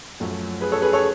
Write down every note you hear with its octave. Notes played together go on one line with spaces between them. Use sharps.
F#2 F3 A3 C#4
G#4 B4
A4 C#5
G#4 B4
A4 C#5